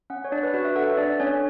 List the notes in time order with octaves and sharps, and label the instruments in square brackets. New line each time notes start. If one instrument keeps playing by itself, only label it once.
[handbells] C#4 F#5
C#5
D4 D5
B4
F#4 B4
E5
A4 F#5
D4 D5
C#4 C#5